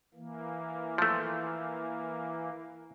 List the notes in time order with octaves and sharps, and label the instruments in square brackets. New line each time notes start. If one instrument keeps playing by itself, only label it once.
[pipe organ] E3 A#3
[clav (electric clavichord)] F3 A3